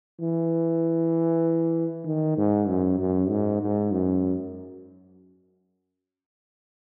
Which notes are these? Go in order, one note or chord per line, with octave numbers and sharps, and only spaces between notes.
E3
D#3
G#2
F#2
F#2
G#2
G#2
F#2